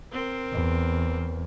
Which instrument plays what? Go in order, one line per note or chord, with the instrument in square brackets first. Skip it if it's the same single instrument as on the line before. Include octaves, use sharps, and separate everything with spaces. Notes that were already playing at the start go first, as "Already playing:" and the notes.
[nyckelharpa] C4 A#4
[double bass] E2